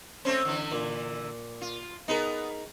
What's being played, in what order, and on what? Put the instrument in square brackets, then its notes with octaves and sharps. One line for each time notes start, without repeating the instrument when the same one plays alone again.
[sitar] A3 C4 C#4 [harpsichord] C5 C#5
[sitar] D3 E3
[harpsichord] A#2
[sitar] F4
[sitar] B3 [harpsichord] D#4 G#4 A#4